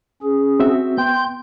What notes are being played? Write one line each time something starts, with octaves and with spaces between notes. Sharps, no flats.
C#4 G#4
C4 F#4 E5
B3 G5 C6 G6